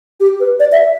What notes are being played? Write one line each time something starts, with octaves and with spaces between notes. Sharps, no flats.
G4
B4
D5
E5